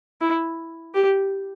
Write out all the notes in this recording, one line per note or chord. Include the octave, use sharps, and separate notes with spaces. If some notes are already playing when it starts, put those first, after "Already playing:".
E4
G4